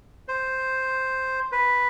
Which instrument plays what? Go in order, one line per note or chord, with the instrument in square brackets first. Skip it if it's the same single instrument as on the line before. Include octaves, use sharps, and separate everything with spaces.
[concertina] C5
B4